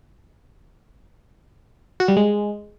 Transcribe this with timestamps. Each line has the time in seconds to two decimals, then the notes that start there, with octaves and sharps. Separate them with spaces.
2.00 F#4
2.08 G3
2.17 G#3